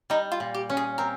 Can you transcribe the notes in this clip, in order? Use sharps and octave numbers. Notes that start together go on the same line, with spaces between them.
G3 D#4
F4
A#2
G4
C#4
G#4
C4 A#4